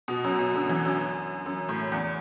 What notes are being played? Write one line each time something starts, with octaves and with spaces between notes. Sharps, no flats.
B2
F#2
B2
D3
E3
F#2
F#2
A2
E2